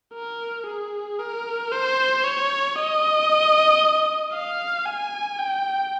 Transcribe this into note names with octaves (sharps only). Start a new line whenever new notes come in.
A#4
G#4
A#4
C5
C#5
D#5
F5
G#5
G5